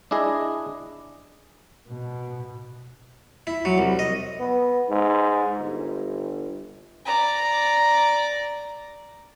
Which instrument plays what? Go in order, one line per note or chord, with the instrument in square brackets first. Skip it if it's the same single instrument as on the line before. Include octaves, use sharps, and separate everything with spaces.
[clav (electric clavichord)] D4 E4 G#4 D#5
[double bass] B2
[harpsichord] E4
F#3
C2
D#5
[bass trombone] B3
G#2
G1
[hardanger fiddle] D5 A#5